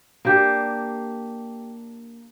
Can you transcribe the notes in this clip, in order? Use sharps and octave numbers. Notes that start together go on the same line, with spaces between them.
A#3 D4 G4